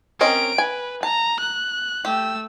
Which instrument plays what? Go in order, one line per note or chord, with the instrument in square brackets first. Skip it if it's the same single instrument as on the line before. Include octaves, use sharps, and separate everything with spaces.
[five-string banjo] C4 C#4 D#5 [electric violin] A#4 D7
[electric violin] B4 [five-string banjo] G#5
[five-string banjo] A5 [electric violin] A#5
[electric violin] F#6
[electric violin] A3 E6 [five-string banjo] G4